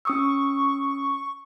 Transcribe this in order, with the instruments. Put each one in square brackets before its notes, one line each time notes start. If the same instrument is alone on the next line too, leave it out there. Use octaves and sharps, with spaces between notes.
[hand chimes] C#4 D#6 E6 [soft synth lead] C#6